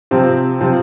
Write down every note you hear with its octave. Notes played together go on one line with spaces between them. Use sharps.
C3 F3 C4
C3 F3 C4